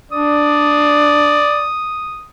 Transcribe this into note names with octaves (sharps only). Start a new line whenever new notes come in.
D4 D5 D#6